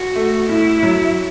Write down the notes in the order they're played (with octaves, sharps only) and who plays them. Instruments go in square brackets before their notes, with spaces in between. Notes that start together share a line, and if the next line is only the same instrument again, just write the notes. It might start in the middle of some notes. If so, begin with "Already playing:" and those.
Already playing: [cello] F#4
[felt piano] A3
[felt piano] A2 [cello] E4
[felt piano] F#3